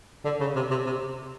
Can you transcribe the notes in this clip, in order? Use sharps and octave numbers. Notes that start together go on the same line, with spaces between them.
D3
C#3
C3
C3
C3